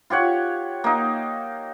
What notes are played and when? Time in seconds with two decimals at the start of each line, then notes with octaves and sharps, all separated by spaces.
0.10 F4 G4 C#5 F#5
0.84 A#3 D#4